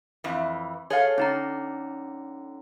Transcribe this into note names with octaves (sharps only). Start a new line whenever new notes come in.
F2 E3
G#4 A4 C#5 F5
D3 C#4 D#4 A#5